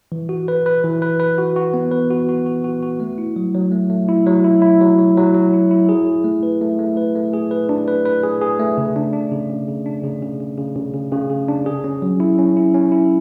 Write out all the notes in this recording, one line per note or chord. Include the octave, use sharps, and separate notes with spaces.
E3
F#4
B4
B4
E3
B4
B4
F#4
F#4
B3
B4
F#4
F#4
F#4
F#4
F#4
A3
E4
F#3
F#3
A3
A3
E4
F#3
E4
E4
F#3
F#3
F#3
F#3
E4
E4
G#4
G#4
A3
B4
A3
A3
B4
A3
G#4
B4
D4
B4
B4
G#4
G#4
A3
C#3
D4
D4
C#3
C#3
C#3
D4
C#3
C#3
C#3
C#3
C#3
C#3
C#3
C#3
D4
G#4
C#4
F#3
E4
C#4
E4
C#4
E4